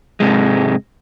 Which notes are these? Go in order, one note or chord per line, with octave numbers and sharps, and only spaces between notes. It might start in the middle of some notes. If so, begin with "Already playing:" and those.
G#2 C3 G#3